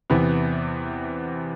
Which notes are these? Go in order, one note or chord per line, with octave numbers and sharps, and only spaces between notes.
E2 C3 E3 B3